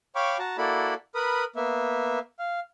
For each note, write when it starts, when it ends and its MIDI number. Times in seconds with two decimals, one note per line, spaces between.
0.15 0.37 73
0.15 0.37 77
0.15 0.37 79
0.15 0.37 83
0.15 0.37 85
0.15 0.37 86
0.39 0.57 66
0.39 0.57 81
0.39 0.57 82
0.58 0.94 58
0.58 0.94 64
0.58 0.94 66
0.58 0.94 69
0.58 0.94 74
0.58 0.94 83
1.15 1.44 70
1.15 1.44 71
1.15 1.44 83
1.15 1.44 87
1.56 2.19 58
1.56 2.19 59
1.56 2.19 76
2.39 2.60 77